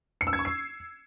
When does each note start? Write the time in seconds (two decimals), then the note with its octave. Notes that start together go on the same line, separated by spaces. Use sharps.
0.21 C#7
0.27 E6
0.33 G#6
0.39 C#6
0.45 C7